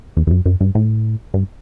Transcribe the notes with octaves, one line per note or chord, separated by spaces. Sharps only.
E2
E2
F#2
F#2
G2
A2
G2